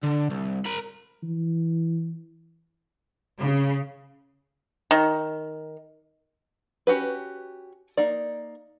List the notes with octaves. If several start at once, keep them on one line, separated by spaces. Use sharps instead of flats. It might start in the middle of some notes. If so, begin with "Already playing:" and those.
D3
C2
A#4 B5
E3
C#3
D#3
C#4 F#4 G4 B4
A#3 D#4 D5